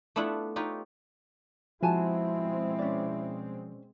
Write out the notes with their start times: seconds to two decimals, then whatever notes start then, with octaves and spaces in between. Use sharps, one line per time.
0.16 A3 B3 D4 E4 F4 F#5
0.56 D#4 F4 G4 B4 C#5
1.83 B2 F3 G#3 C4 E4 F#4 G#5 A5
2.79 C#4 D5